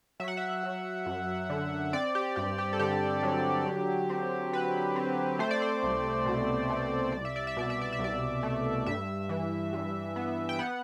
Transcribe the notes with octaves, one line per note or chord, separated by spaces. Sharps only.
F#3 E5
F#5
E5
F#3
F#2
D3
C4 D5
G4
G2 G4
G4
A4
D3 G4
F#3
D3
C4
C4 B4
C4
A3 C5
D5
C5
C2
B2
A3
C2 D5
E5
D5
E5
B2 D5
E5
D5
E5
C2
D5
A3
G2 E5
E3
G2
B3
G5
B3 F#5